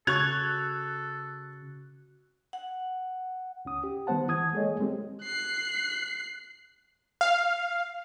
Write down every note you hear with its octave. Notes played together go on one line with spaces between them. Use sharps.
C#3 F#4 A4 C#6 F#6 G#6 F7
F#5
C#2 C#4 D#6
G4
D#3 G3 B3 C5 F#5 A5
E3 D#6 G#6
G#3 A#3 G#4 A4 C#5 D#5
G3 G#3 C4 G4
F#6 C7
F5